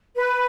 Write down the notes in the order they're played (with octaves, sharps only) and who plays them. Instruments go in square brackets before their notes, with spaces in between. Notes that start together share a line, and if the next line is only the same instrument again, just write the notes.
[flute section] B4